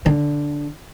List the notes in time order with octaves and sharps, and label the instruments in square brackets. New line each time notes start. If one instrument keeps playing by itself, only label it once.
[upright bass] D3